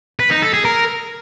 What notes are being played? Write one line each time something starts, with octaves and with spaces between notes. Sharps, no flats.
B4
D#4
A4
G#4
A#4